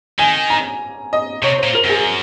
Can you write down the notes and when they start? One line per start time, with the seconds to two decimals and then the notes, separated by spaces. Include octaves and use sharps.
0.19 D#3 G#5
0.50 A#5
1.13 D#5
1.43 C3 C#5
1.58 C5
1.64 A#2
1.75 A#4
1.84 F#2
1.90 G#4